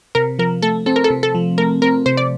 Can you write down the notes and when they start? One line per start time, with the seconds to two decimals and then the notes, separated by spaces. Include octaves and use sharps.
0.15 C3 A#4
0.39 F3 A#4
0.62 A3 A4
0.86 C4 A4
0.96 A#4
1.04 A4
1.10 C3
1.23 A4
1.35 F3
1.58 A3 A#4
1.82 C4 A#4
2.06 C3 C5
2.17 D5